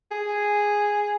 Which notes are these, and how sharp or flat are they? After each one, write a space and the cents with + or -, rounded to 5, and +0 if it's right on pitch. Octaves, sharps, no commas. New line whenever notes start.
G#4 -5